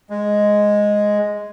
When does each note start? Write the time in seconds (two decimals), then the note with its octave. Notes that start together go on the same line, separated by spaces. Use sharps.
0.10 G#3